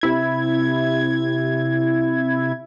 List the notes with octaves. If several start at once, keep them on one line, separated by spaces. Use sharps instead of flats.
C3 E4 G#6